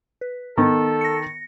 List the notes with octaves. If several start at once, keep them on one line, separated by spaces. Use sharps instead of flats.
B4
D#3 B3 A4
A#6 C#7